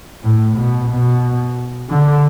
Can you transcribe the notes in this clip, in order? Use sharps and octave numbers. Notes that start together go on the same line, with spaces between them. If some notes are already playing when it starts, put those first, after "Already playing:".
A2
B2
B2
D3